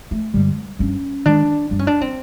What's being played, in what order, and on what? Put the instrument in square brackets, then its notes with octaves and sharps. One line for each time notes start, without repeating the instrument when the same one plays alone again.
[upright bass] A3
[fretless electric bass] G2 D3 G3 [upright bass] G#3
[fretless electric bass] G2 [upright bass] C#4
[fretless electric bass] D#3 G#3 [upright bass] D4
[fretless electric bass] G2 [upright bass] D4
[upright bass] C#4
D4
C4